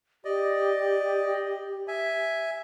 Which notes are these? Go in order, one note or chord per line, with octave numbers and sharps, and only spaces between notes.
G4 D5 D#5
E5 G#5